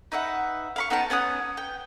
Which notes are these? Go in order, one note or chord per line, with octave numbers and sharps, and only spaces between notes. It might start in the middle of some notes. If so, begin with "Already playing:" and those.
D#4 B4 E5 F#5
F5 B5 C#6
B3 D#4 G5 A5
B3 C#4 F#5 D#6
G5